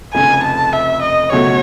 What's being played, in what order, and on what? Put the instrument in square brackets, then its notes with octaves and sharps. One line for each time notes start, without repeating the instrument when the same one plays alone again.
[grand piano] F1 F2 C#3 [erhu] G#5
[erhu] A5
E5
D#5
[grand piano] C#2 B2 F#3 A3 [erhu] C#5